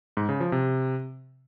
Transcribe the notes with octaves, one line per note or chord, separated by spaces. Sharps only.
G#2
C#3
F3
C3